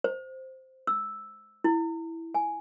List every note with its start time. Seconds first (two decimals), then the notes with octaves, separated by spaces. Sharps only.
0.04 C5
0.87 E6
1.64 E4
2.35 G#5